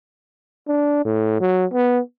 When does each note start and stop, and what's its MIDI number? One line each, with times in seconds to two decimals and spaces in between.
0.68 1.04 62
1.05 1.39 45
1.41 1.66 54
1.74 2.00 59